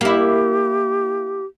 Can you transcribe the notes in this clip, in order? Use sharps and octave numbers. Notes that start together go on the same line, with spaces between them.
A#3 E4 G4